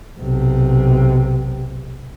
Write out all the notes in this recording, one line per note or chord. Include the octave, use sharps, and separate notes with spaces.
B1 C3